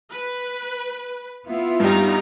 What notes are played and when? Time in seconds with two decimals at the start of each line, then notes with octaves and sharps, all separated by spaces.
0.10 B4
1.47 B3 E4 F4
1.80 G2 G3 D#4 G4 A#5